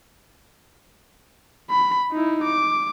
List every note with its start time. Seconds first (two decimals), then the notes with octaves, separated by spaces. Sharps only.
1.70 B5
2.12 D#4 E4
2.44 D6